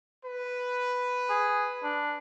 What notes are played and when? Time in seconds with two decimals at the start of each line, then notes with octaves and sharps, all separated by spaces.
0.24 B4
1.29 G#4
1.83 D4